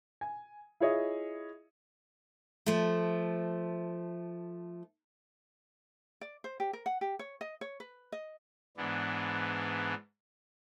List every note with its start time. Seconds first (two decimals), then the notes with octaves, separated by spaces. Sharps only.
0.21 G#5
0.80 E4 F4 G#4 C#5 D#5 E5
2.66 F3 A3
6.21 D5
6.44 C5
6.60 G4
6.73 A#4
6.86 F#5
7.01 G4
7.19 C#5
7.41 D#5
7.61 C#5
7.80 B4
8.12 D#5
8.77 G#2 E3 B3 D4